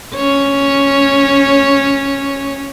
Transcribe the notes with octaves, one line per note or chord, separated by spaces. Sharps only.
C#4 C#5